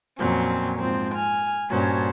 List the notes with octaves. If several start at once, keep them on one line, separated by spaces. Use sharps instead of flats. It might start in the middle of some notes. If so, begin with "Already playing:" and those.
F2 A#2 F#3 C4 C#4
G#2 F3 C4
G#5 F6
G2 A#2 C#4 F#4 C5 A5